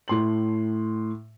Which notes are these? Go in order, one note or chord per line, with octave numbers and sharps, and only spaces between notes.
A2 C6 F#7